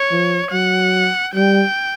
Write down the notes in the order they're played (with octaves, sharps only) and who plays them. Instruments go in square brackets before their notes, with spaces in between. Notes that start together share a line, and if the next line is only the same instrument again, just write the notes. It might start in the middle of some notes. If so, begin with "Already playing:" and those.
Already playing: [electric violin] C#5
[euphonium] F3
[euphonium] F#3 [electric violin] F#5
[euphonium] G3 [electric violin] G5